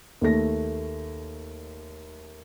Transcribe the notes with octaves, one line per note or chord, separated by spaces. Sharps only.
D#2 A3 A#6